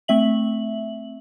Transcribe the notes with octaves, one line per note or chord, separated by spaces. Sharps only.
A3 C4 E5 F#7